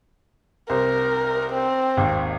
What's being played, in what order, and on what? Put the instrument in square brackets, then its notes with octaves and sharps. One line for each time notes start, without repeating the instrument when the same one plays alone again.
[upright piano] C2 C5 [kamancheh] A#4
[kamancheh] C4
[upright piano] G#1 D#2